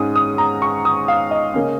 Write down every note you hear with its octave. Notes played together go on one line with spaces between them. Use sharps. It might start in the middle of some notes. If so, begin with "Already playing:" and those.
Already playing: G#2 G#3 C#4 D#6
D#6
A#5
C#6
D#6
F5
D#5
C#3 A#3 C#4